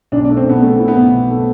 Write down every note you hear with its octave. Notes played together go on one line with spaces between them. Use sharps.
B1 D4
D4
A3
C4
B1 B3
B2 A3
E4
B3
B1
B2
A3